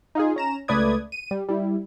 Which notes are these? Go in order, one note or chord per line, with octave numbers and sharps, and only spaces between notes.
D#4 F4 G#4
C#4 A#5 E7
C#2 A3 B4 D5 D#6 G#6
D#7
G3
G3 E4